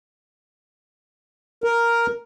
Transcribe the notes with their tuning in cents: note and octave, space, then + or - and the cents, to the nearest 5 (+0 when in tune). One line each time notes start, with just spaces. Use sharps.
A#4 +0